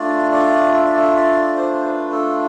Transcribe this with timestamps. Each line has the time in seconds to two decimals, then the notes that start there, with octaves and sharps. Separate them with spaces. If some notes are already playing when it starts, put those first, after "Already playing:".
Already playing: A3 D4 F4 D5
0.32 D5
0.74 E5
0.85 D5
0.97 E5
1.15 D5
1.57 C5
1.85 B4
2.12 A4